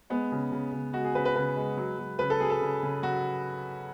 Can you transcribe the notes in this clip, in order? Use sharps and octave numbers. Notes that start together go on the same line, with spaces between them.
G#3 B3
C#3
C#3
C#3
G#3 F#4
G#4
C#3 B4
B4
C#3 B4
G#3
F#3
F#3
C#3 B4
A4
F#3 G#4
A4
C#3
C#3
F#3 F#4